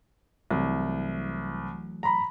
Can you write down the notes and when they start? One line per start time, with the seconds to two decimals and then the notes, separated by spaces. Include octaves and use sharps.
0.51 C2 E3 F#3 A3
2.03 A#5 B5